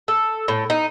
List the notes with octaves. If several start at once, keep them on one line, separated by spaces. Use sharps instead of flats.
A4
A2
D#4